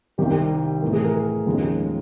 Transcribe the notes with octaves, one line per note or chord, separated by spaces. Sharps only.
C2 C3 D#3 G3 G4
A2 E3 A3
G#4
A#4
D#2 C#3 F3 G#3